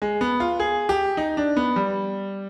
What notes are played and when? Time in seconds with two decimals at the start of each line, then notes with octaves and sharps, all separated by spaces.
0.02 G#3
0.21 B3
0.40 F4
0.60 G#4
0.89 G4
1.17 D#4
1.37 D4
1.56 B3
1.76 G3